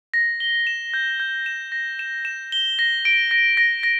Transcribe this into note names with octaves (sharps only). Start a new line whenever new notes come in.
A#6
G7
E7
G6
G6
E7
A#6
E7
E7
G7
A#6
D7
A#6
A#6
A#6